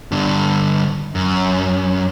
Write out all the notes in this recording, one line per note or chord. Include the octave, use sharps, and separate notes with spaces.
G2 D3
F#2